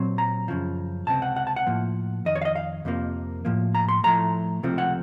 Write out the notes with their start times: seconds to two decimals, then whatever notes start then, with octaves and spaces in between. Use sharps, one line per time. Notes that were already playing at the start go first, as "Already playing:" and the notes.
Already playing: A#2 F#3 C4
0.18 A#5
0.48 F#2 C#3 F3
1.07 C#2 C3 C4 A5
1.22 F#5
1.36 F#5
1.47 A5
1.56 F#5
1.67 A2 F3 A#3
2.25 F2 D#3 D#5
2.35 C#5
2.42 F5
2.45 D#5
2.56 F5
2.85 F2 C3 F3 A#3
3.45 A2 F3 A#3
3.75 A#5
3.89 C6
4.04 A2 F3 A3 A#5
4.63 C#2 C3 F3 A3 C4
4.78 F#5